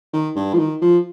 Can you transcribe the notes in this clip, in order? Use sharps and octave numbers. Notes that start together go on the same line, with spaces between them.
D#3
G2
F3
D#3
F3